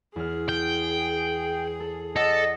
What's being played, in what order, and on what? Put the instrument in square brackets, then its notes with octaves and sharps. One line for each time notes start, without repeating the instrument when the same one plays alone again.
[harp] E2 F6 [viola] G#4
[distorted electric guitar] G5
[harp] A4
[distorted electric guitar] A4 [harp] D5 F#5 A6 [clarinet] D#5